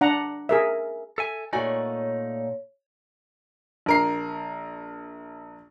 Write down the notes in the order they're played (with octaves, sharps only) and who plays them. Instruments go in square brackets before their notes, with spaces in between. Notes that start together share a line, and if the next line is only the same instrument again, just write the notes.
[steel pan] D4 F#5 A#5
G#4 A#4 E5
[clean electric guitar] A4 E5 G#5
[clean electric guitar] A#2 A3 D#4 [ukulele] F#4 D5 G#5 [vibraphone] C#5
[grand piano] A#1 A#4 C7